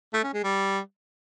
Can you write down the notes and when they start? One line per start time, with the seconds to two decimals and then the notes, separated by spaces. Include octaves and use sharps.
0.14 A3
0.24 C#4
0.34 G#3
0.44 G3